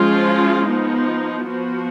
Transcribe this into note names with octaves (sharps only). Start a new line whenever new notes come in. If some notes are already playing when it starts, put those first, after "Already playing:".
Already playing: F3 G#3 C#4 F4
F3 B3 D#4
F3 B3 F#4